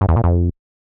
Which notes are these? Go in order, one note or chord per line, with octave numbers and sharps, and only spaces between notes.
G2
E2
A#2
F2